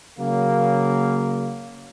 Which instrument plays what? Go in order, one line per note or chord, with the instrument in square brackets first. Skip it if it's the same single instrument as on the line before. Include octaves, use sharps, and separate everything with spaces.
[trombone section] C#3 F#3 A#3